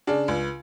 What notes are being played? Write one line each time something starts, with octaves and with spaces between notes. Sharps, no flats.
C#3 D4
C#2